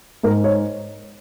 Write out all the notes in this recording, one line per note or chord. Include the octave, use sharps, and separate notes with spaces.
G#2 A#4
C#5